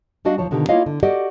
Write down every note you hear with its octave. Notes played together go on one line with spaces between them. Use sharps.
G3 D4 F#4 D#5 F5
D#2 F3 C#5 A5
B2 D3 D#3 F4 G4
A#3 E4 F4 C#5 D#5 F5
D3
F#4 G4 A4 D5 D#5 F#5